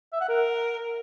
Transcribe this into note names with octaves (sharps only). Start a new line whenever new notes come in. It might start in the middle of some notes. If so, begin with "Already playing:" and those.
E5
F#5
A#4